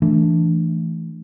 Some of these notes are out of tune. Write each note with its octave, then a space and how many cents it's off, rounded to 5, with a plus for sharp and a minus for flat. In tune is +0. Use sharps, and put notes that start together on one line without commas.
E3 +5 A3 +0 D4 +0